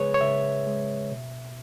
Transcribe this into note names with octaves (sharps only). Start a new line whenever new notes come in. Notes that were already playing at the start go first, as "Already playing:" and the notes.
Already playing: C#3 G#3 G#4 B4 C#5
C#5
C#3 E5
G#3
B2